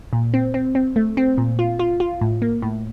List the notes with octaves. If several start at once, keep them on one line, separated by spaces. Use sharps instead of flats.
A#2
C4
C4
C4
A3
C4
A#2
F4
F4
F4
A2
A#3
A2